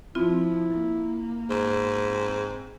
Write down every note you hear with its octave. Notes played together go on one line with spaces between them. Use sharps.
F3 C4 E4 F4
A#3
G#2
C4